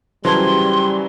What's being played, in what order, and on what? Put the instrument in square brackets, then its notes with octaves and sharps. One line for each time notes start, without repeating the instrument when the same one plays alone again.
[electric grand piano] C#3 E3 F#3 [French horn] G3 [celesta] C5 A5 G#6 [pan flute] C6